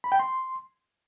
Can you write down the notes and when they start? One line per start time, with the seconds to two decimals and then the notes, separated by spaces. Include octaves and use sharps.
0.04 B5
0.12 G5
0.19 C6